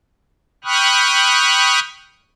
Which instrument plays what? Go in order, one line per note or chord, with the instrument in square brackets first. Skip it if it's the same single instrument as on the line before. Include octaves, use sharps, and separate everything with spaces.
[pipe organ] G5 B5 C#6 D#6 F6 F#6